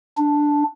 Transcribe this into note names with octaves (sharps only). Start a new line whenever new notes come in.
D4